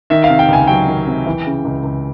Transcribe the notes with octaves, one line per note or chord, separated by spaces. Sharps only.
D#3 E5
F5
C3
G5
C#2 G#5
F#3 G5
D#3
C3
E3
C#3
C#2
C#2